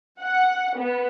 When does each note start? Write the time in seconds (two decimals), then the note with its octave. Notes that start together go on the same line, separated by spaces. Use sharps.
0.20 F#5
0.78 B3